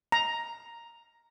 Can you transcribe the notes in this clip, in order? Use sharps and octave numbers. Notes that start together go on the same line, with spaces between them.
A#5